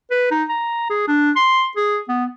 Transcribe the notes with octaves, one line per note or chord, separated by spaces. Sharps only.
B4
D#4
A#5
G#4
D4
C6
G#4
B3